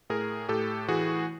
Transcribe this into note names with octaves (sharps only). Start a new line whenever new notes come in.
A2 G#4 A#4
A2 G4 A4
E3 F#4 G#4